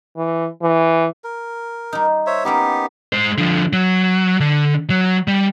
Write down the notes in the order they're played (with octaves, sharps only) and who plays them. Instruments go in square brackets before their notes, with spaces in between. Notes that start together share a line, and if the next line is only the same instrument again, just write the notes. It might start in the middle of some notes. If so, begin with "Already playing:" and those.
[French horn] E3
E3
[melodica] A#4
[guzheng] G3 D#4
[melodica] C5 C#5 E5
[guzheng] A#3 C#4 E4 [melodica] B3 D#4 G4
[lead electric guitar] G#3 C5
D3 F3
F#3
D3
F#3
G3